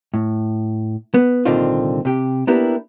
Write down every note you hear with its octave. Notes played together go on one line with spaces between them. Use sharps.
A2
B3
C2 A#2 D3 D#3 C4 F4
C3 G4
A#3 B3 D4 E4 G4 A#4